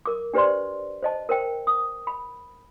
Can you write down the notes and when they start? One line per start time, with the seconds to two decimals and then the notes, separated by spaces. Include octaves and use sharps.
0.06 A#4 D6
0.33 D4 G4 B4 C5 D5 C6
1.03 C5 D#5 A5
1.29 A#4 C5 G5
1.67 D#6
2.07 B5